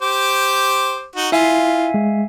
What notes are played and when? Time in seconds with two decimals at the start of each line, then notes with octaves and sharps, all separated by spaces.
0.02 G4 C5 D6
1.16 D#4 F#4
1.32 E4 F4 E5 F5 G#5
1.94 G#3